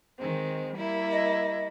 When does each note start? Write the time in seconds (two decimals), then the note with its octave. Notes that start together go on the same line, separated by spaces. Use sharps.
0.18 D#3 G#3 C4
0.75 G3 A#3 E4
1.12 D#5